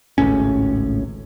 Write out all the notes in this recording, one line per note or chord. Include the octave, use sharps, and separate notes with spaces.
G#1 C#2 A2 C#4